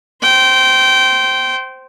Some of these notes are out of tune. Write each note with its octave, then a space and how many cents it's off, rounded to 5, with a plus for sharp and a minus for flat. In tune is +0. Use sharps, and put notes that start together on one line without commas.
C5 +0 G5 -20